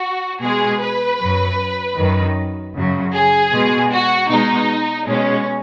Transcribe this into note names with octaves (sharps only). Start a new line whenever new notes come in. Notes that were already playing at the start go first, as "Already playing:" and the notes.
Already playing: F#4
B2 G#3 G#4
B4
F#2 F#3
F#2 D#3 F#3
F#2 C#3 F#3
G#4
B2 G#3
F#4
B2 G#3 D#4
B2 G#3 C#4